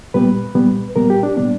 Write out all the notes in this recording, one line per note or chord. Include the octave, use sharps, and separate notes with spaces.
A#2 G3 B3 B4
A#2 G3 B3
A#2 G3 B3 A#4
G4
D4
A#2 G3 B3 D4